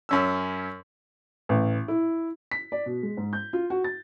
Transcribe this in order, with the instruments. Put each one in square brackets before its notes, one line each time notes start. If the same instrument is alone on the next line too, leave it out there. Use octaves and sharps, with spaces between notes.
[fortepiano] F#2 C#4 E6
[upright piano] A1
E4
B6
D5
B2
G#3
G#2
G6
F4
F#4
A6